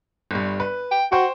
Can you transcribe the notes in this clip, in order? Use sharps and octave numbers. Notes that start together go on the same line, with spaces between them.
G1 G2
B4
G5
F#4 C5 G5 C#6